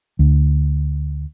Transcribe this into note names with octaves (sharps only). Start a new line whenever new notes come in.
D2